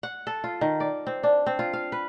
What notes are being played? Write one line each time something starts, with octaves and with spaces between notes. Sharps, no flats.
F#5
A4
F4
D#3
D5
C4
D4
C4
F4
F5
B4